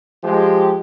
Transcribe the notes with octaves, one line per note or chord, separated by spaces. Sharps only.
F3 G#3 G4